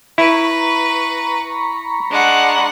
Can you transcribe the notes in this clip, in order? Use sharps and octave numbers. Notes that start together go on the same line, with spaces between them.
E4 B4 A#5 B5 C#6
G#3 D4 F#5